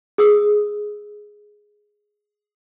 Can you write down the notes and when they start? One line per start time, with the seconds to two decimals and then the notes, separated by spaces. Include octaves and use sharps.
0.18 G#4 D#6 E6